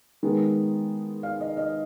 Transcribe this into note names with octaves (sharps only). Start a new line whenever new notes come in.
D#3 G#3 B3
F5
D#5
D#5